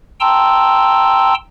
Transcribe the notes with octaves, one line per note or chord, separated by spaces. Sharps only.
G5 A5 A#5 C6 E6